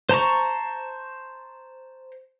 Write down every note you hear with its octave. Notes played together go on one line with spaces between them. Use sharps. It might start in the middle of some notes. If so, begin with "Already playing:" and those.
C5 A5 A#5 C#6